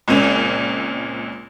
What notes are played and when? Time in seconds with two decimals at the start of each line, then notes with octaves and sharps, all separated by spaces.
0.08 C#2 A#2 C4 C#4